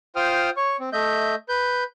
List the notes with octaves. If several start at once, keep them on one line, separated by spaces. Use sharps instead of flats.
F4 C5 G5 D#6 F6
C#5 C#6
C4
A3 D#5 E5 G6
B4 G6